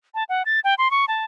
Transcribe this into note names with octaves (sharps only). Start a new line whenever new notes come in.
A5
F#5
A6
G5
C6
C#6
A5